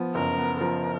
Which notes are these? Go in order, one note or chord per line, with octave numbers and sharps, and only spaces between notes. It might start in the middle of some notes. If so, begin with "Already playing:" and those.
Already playing: F3 B3
F#1 A#4
B3
F3 A#4